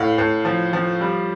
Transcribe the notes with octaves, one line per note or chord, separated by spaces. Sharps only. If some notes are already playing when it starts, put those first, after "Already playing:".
Already playing: A2 F5
A2
F3
F3
G3